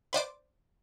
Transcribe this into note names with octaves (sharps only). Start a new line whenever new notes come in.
B4 C5 D5 D6